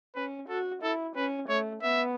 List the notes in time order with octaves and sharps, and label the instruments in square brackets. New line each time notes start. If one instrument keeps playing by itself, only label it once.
[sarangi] C#4 [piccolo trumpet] B4
[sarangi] F#4 [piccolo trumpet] A4
[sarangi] E4 [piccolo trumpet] A4
[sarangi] C#4 [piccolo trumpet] B4
[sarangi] A3 [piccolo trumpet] C#5
[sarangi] B3 [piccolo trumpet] E5